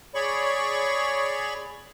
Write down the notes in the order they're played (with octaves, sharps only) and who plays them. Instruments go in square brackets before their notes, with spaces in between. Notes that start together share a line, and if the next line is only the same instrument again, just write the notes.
[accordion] G#4 C#5 D5 B5 C#6